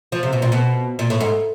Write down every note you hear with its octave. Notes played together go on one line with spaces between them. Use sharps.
F3
C3
B2
A#2
B2
A#2
A2
G#2